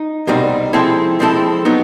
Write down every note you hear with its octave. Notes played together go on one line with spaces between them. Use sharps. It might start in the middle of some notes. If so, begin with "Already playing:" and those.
Already playing: D#4
C2 B2 G3 C4 D#4
F3 G#3 C4 E4 A4
F3 G#3 C4 E4 A4
F#3 B3 D#4